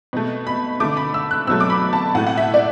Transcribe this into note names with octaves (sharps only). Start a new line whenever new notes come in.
B2 A3
B5
D3 A3 D6
B5
E6
F#6
B2 F#3 A3 E6
D6
B5
A5
A2 A3 F#5
F#5
E5
D5